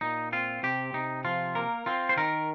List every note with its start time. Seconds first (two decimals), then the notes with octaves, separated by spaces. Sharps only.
0.01 A#2 D#4
0.32 C4 F4
0.63 C3 G4
0.94 C3 D#4
1.25 F3 F4
1.55 A#3 A#4
1.86 C4 F4
2.09 C5
2.17 D#3 A#4